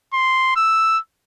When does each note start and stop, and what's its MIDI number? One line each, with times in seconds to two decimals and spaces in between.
0.14 0.52 84
0.56 0.99 88